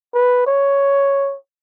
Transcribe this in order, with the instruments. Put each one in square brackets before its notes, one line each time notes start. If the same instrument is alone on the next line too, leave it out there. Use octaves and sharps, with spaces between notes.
[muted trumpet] B4
C#5